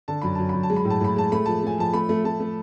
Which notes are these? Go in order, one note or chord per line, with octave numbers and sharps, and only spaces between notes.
D3 A5
F#2 B5
F#2 A5
F#2 B5
A5
G#3
B5
A2
A5
A2 B5
G#3 A5
A3 B5
F3 A5
A3 G#5
F3 A5
A3 B5
A3
A3 A5
A3